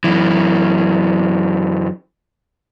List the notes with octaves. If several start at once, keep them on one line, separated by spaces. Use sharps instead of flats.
F#2 E3